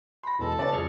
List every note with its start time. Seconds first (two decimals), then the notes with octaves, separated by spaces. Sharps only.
0.23 B5 C6 A#6
0.39 E2 B2 G#3 A4
0.59 C#3 C#4 B4 D5 A5 A6
0.72 F2 G#3 G#4 C#6 F6